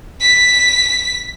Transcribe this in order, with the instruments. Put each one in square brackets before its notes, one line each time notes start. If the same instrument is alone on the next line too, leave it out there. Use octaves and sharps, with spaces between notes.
[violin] B6